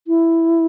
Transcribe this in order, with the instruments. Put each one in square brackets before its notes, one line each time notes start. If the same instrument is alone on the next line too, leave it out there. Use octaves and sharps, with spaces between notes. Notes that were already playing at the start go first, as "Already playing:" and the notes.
[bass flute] E4